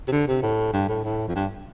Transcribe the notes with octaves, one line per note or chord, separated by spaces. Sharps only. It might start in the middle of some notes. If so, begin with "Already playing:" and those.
C3
D3
C3
A2
G2
A2
A2
F2
G2